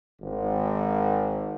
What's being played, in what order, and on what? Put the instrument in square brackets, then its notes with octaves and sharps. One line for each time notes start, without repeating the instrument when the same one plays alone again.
[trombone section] G#1